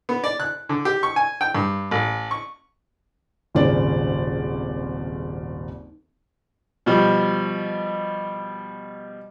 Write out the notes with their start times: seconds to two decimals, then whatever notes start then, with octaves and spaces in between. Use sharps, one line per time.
0.09 B3
0.24 D5
0.40 F#6
0.69 D3
0.85 G4
1.03 C#6
1.16 G#5
1.41 G5
1.55 G2
1.91 A1
2.31 C#6
3.55 D#1 G#1 C#3 D5
6.86 B2 F3 G3